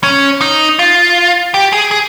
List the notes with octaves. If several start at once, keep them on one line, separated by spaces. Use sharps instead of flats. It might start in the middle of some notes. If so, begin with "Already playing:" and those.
C#4
D#4
F4
G4
G#4
G#4